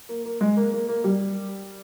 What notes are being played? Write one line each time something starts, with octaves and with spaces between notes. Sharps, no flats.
A#3
A#3
G#3
A#3
A#3
A#3
G3